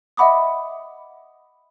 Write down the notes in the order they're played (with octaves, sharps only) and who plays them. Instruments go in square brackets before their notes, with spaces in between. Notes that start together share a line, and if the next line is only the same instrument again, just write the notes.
[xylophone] D#5 E5 F#5 B5 D6 D#6